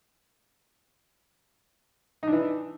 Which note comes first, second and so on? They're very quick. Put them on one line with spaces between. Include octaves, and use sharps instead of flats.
D#4 D4 E3